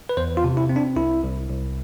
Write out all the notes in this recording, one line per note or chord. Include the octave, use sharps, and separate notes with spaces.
B4
E2 C5
F4
C3
E4
C4
D4
C2 E4
C2
C2